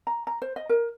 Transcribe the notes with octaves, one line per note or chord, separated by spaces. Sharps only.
A#5
A#5
C5
D#5
A#4